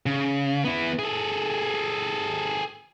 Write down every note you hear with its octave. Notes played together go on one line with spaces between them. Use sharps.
C#3
B3 E4
G#4 A4